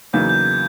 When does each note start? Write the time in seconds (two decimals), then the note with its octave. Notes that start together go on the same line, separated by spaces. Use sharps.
0.13 E2 C#3 F#3 A#3 D#4 G6
0.29 G6
0.45 G#6